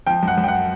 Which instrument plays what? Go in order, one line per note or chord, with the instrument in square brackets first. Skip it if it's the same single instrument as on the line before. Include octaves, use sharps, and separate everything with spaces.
[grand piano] F3 G5
F#2 F#5
F#2
G5
F#5